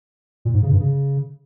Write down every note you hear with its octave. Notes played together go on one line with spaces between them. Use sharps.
A#2
G#2
C#3
G2
C#3